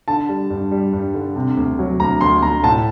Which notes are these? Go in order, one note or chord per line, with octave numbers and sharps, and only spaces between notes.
D3 A5
G3
G2
G3
G2
D3
C3
D2
F#3
D2 A#5
D2 C6
D2 A#5
A2 A5